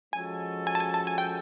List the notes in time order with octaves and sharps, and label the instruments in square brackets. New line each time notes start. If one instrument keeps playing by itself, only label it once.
[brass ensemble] F3 G#3 C#4 F#4 A4 [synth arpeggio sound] G#5
[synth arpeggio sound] G#5
A5
G#5
A5
G#5
G5